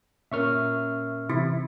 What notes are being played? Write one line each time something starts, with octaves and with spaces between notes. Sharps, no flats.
A#2 C#4 A#4 E5 C#6 F6
C3 E3 E4